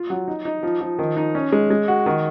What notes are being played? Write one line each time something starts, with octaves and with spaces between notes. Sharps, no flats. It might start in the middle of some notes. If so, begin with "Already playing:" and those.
Already playing: F4
F#3
D#4
D#4
F3
F3
D#3
D#4
C#4
G#3
G#3
F#4
D#3